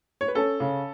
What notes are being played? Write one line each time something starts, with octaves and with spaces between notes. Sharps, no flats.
C#5
B4
C#4 A4
C#3